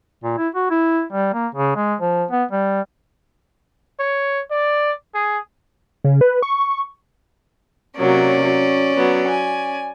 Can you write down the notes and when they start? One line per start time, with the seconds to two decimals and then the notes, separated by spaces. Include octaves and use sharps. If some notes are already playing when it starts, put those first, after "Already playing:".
0.24 A#2
0.38 E4
0.55 F#4
0.71 E4
1.13 G3
1.34 A#3
1.55 C#3
1.76 G#3
2.00 F3
2.31 B3
2.51 G3
3.99 C#5
4.51 D5
5.14 G#4
6.04 C#3
6.21 B4
6.42 C#6
7.97 C3 F#3 A#3 C#4 D5
8.42 F#3
8.96 F#3 B3
9.27 G#5